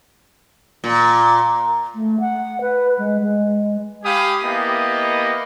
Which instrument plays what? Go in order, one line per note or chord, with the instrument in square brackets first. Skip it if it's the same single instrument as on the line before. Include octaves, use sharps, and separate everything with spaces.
[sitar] A#2
[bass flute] A3
F#5
B4
G#3
G#3
[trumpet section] G4 F5 G#5 B5 D#6
A#3 B3 E4 G4 D#5